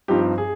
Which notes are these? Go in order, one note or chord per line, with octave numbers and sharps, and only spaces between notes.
G2 F3 C4 D#4 G4
G#4